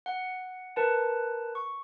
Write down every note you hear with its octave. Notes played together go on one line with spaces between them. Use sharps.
F#5
A#4 B4 A5
C#6